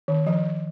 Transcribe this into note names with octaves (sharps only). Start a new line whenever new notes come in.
D#3
F3